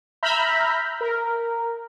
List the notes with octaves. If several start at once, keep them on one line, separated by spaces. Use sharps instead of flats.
E5 A#5 B5 F6 G6 B6
A#4